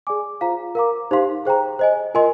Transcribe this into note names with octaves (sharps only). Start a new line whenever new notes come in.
G#4 D5 G#5 D6
F4 C5 F5 A#5
A#4 F5 A#5 D6
D#4 G4 C5 F5 C6
G#4 C5 G5 A#5
C5 D#5 G#5
F4 A#4 D#5 G#5 C6